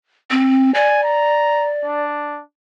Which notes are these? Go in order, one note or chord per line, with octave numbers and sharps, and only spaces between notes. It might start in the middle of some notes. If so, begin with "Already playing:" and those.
C4
D5 G#5
A#5
D4